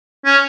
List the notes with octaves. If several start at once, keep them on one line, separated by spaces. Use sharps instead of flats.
C#4